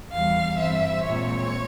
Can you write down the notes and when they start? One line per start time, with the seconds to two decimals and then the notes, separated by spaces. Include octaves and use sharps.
0.11 E2 E3 G3 F5
0.58 G2 E3 G3 C4 E5
1.05 A#2 G#3 C4 C#5